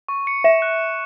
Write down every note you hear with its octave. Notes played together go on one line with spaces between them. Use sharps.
C#6
C#7
E5 E7
F#6
E7